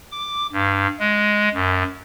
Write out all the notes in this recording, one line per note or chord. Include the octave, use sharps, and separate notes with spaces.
D6
G2
G#3
F#2